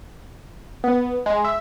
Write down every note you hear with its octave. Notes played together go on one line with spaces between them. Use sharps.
B3
G#3
E5